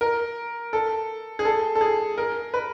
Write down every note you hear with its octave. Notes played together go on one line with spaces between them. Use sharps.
A#4
A4
G#4
A4
A4
G#4
A#4
B4